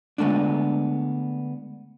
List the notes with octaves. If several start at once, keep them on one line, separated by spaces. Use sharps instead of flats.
D3 G#3 A3 B3 D4